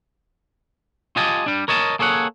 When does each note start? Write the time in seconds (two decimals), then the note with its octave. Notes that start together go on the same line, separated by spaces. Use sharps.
1.16 F4 G4 D#5 G#5 A5
1.46 G3 D4
1.68 A#4 C#5 D#5 A5
1.99 A#3 G#4 A4 C#5 F#5